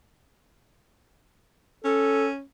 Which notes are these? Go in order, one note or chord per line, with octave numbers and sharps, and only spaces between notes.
C#4 A4